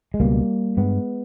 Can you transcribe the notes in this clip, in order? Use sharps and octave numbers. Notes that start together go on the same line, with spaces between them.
G#3
C#2 B2 G3 A#3
G2 G#3 B3